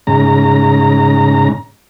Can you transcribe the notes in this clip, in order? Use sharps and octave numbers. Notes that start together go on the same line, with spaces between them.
G#2 C#3 A#5